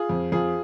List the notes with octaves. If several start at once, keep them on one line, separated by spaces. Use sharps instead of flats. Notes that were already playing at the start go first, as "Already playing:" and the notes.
Already playing: F4 G#4
F2
F2 F4 G#4